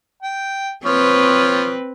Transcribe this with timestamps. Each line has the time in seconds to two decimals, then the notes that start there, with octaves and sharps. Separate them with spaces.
0.22 G5
0.85 F3 C4 B4 C#5